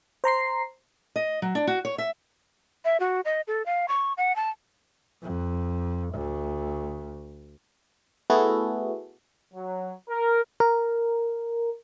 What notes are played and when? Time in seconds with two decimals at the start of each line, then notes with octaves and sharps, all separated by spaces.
0.24 C5 A#5 C6 C7
1.16 D#5
1.42 F#3
1.55 D4
1.67 F#4
1.85 C#5
1.98 E5
2.85 E5
3.00 F#4
3.25 D#5
3.47 A4
3.66 F5
3.88 C#6
4.17 F#5
4.36 A5
5.23 F2
6.15 D2
8.30 A3 B3 E4 F#4 G#4 A4
9.52 F#3
10.09 A#4
10.60 A#4